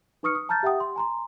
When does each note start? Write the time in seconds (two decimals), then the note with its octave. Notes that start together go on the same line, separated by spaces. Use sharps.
0.23 D#4 B4 C#6 D#6 F6 C#7
0.35 D#6
0.49 A5 A#5 F6 G6 A6
0.63 G4 E5 F#5 G5 D#6
0.80 C6
0.96 G#5 A#5 C6